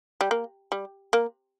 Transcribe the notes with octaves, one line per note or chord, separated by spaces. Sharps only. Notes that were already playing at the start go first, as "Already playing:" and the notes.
G3
A#3
G3
A#3